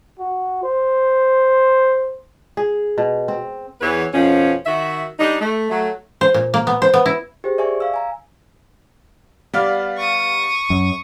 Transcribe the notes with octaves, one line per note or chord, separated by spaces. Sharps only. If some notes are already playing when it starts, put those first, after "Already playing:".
F#4
C5
G#4
B2
C4
E2 E3 B3 B4 C#5
F2 B2 F3 C#4
D#3 F#4 E5
G3 D4 D#4
A3
F#3 A3
C5
A#2
A#3
B3
C5
B3
E4
G4 G#4 C5
D5 E5 G#5 C#6
F5 E6
G#5 A#5
G3 B3 D5 F5 F6
C#6 D#6
F#2